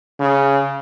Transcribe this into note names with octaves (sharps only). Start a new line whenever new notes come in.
C#3